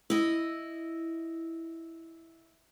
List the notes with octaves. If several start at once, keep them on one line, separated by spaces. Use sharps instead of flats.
E4 D#5